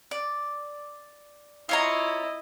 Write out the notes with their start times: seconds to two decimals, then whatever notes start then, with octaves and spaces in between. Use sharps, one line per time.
0.11 D5
1.69 E4 F4 C#5 D#5 A#5